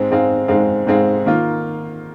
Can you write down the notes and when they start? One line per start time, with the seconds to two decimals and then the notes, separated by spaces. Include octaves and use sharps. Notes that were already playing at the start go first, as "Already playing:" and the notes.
Already playing: G#2 G#3 C4 G#4
0.10 G#2 G#3 C4 G#4 F5
0.48 G#2 G#3 C4 G#4 F5
0.87 G#2 G#3 C4 G#4 F5
1.26 D#3 A#3 F4